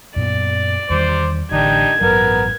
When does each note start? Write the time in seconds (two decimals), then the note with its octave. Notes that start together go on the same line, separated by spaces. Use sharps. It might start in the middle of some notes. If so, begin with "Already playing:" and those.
0.16 F#2 A#2 B3 D5
0.90 E2 D#3 G3 C5 D6
1.52 A1 D3 D4 D#4 G4 G#6
2.01 A1 G2 F#3 B3 A#4